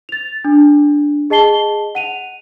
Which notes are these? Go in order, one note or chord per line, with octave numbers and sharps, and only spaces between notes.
A6 F7
D4
G#4 D#5 A5 C7 G7
F#5 D#7 F7